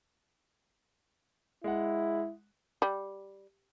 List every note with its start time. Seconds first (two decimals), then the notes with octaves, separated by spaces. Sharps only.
1.64 G#3 E4 F#5
2.82 G3